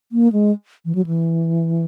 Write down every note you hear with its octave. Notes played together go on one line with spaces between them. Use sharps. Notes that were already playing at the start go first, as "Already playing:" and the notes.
A#3
G#3
E3
F#3
E3